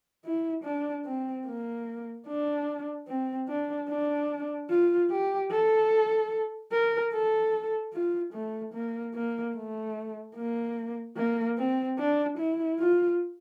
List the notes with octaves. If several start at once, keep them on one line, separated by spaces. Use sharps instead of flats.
E4
D4
C4
A#3
D4
C4
D4
D4
F4
G4
A4
A#4
A4
F4
A3
A#3
A#3
A3
A#3
A#3
C4
D4
E4
F4